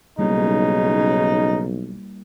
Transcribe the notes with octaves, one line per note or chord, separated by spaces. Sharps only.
B1 C#3 G3 A#3 D#4 E4